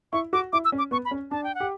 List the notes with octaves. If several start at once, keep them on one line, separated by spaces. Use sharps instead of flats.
E4 C#6
F#4 D6
E4 D6
E6
C#4
D6
B3 C#6
B5
C#4
D4 A5
G5
F#5
G4